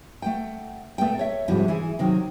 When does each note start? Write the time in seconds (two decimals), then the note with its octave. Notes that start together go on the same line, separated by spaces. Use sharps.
0.22 A3 F#5 G5
0.98 A#2 A3 B3 G5
1.18 A4 C#5 E5
1.48 G#2 C3 F3 G3 E4 F#4
1.68 E3 E4 G#4
1.99 C3 D#3 F#3 F#4